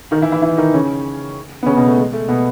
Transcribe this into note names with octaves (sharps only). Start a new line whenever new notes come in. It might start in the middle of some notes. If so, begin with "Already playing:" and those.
D#3 D#4
E3 E4
E3 E4
E3 E4
D#3 D#4
C#3 C#4
B3
C#3 C#4
B2 B3
A3
G#3
A3
B2 B3